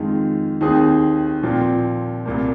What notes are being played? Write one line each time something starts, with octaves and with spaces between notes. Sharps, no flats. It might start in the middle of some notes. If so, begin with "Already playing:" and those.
Already playing: F2 D#3 G#3 F4
D#2 D#3 C4 G#4
A#2 F3 C4
C2 A#2 A#3